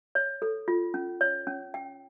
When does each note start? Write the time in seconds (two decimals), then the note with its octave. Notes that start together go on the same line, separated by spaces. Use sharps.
0.15 C#5
0.42 A4
0.68 F4
0.94 C#4
1.21 C#5
1.47 C#4
1.74 G5